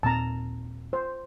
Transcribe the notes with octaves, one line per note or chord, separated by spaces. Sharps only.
D#2 A#2 C4 A5 A#5
C5